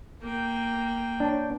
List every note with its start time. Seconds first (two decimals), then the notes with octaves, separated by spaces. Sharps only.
0.21 A#3 G5
1.20 D4 C#5